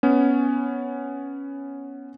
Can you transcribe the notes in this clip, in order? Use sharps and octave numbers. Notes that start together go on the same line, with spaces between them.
B3 C#4